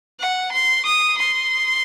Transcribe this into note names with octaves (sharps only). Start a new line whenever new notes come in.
F#5
C6
D#6
C6